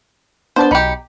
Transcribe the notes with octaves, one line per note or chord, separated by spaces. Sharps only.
B3 D4 C5 D5 A5
B1 D#4 G4 B5 C#7